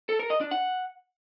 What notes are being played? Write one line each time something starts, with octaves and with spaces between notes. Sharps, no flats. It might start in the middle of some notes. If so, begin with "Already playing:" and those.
A4
A#4
D#5
D4
F#5